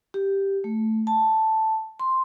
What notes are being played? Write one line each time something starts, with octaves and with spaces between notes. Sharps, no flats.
G4
A3
A5
C6